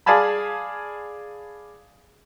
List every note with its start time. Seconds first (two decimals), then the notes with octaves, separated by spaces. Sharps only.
0.06 G#4 D5 F5 G#5 A5 B5